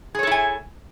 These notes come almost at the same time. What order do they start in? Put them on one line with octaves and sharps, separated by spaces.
G#4 C#5 A4 E4 G#5